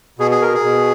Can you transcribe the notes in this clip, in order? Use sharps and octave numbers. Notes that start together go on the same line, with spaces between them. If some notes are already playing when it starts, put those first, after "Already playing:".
B2 G#4
G#4
A#4
G#4
B2